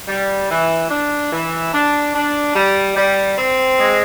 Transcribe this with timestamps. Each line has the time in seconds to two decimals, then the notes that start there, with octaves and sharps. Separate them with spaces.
0.08 G3
0.50 E3
0.90 D4
1.32 E3
1.74 D4
2.15 D4
2.55 G3
2.96 G3
3.37 C4
3.79 G#3